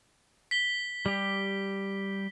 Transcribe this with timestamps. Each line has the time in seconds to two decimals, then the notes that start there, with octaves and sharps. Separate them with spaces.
0.51 B6 G7
1.06 G3 G4